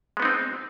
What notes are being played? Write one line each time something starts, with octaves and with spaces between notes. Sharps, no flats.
G#3 B3 C4 D#4